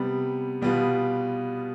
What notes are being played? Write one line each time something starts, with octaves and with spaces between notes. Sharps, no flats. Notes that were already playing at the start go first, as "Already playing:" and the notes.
Already playing: C3 G3 B3
B2 G3 B3 F4